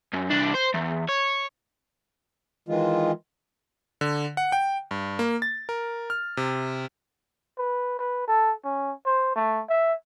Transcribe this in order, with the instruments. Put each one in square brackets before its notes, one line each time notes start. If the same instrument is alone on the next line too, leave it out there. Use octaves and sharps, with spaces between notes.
[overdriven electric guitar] F#2
C2 D4
C5
E2
C#5
[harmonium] D#3 E3 G#3 F4
[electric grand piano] D3
F#5
G5
G2
A#3
A6
A#4
F6
C3
[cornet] B4
B4
A4
C#4
C5
A3
E5